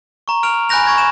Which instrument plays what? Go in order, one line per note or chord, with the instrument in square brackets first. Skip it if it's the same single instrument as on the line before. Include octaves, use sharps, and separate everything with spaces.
[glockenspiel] A#5 C#6
F6 D7 F7
G#5 B5 F#6 G6 A#6 F7
C#6 G#6 A#6
E7